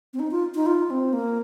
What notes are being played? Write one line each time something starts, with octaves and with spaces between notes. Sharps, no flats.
C4
D#4
F4
D#4
F4
C4
A#3